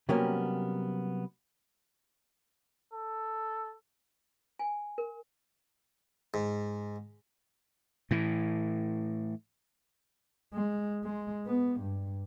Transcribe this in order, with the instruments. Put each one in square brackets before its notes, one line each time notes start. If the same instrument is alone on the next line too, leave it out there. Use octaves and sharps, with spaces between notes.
[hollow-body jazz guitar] C3 F#3 G3 A#3 B3 C#4
[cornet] A4
[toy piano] G#5
A#4
[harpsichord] G#2
[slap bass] A2 E3
[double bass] G#3
G#3
B3
G2